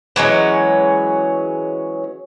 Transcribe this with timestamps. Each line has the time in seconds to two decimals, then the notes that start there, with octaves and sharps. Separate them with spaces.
0.16 E3 F#3 G#3 C#4